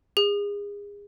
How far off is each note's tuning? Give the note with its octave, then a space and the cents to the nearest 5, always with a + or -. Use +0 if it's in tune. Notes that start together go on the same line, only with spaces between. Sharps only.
G#4 -30